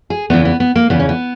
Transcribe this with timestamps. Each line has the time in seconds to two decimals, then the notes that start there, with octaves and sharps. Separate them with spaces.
0.10 G#4
0.30 E2 C#3 E3 B3
0.45 B3
0.60 B3
0.76 A#3
0.90 E2 C#3 E3 B3
1.00 C#4
1.09 B3